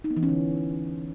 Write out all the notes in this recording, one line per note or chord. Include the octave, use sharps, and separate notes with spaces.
D#4
B3
E3
C#4
D3